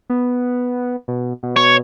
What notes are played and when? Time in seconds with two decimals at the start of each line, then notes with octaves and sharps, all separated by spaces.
0.10 B3
1.08 B2
1.43 B2
1.56 C#5